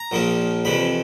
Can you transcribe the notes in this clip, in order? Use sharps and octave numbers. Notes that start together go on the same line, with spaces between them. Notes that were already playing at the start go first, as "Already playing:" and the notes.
Already playing: A#5
A#1 A#2 F3 A#3
F2 C3 E3 B5